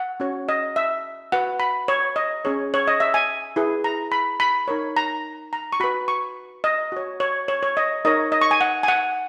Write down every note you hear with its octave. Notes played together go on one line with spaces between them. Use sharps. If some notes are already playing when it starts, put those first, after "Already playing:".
Already playing: F#5
C#4 F#4 C#5
D#5
E5
F#4 B4 F#5
B5
C#5
D#5
C#4 G#4 C#5
C#5
D#5
E5
G#5
E4 G#4 B4
A#5
B5
B5
D#4 A#4 C#5
A#5
A#5
C#6
F#4 B4 B5
C#6
D#5
F#4 C#5
C#5
C#5
C#5
D#5
D#4 A#4 C#5 D#5
D#5
C#6
G#5
F#5
G#5
F#5